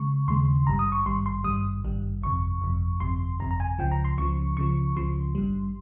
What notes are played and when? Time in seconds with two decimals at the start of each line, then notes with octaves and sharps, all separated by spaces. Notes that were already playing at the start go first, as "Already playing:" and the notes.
Already playing: C#3 G#3 C#6
0.27 D#2 C#3 G#3 C6
0.67 G#1 G2 G3 A#5
0.79 D#6
0.92 C#6
1.06 G#1 G2 G3 C6
1.26 C6
1.44 G#1 G2 G3 D#6
1.84 G#1 G2 G3
2.22 G1 F2 C3 C#6
2.62 G1 F2 C3
3.00 G1 F2 C3 C6
3.40 G1 F2 C3 A#5
3.51 A#5
3.60 G#5
3.79 C#2 C#3 F3 G5
3.92 A#5
4.05 C6
4.18 C#2 C#3 F3 C#6
4.57 C#2 C#3 F3 C#6
4.96 C#2 C#3 F3 C6
5.35 G#1 G2 G3